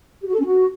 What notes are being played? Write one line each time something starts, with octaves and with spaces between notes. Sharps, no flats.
G4
F#4
A4
C#4
F#4